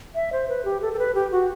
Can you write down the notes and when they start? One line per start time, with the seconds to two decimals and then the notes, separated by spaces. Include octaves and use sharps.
0.15 E5
0.33 C5
0.49 B4
0.65 G4
0.82 A4
0.93 A4
0.99 B4
1.15 G4
1.32 F#4